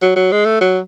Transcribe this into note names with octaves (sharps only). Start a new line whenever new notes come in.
F#3
F#3
G#3
A3
F#3